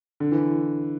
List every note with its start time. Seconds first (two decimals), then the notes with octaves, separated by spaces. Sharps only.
0.20 D3
0.32 E3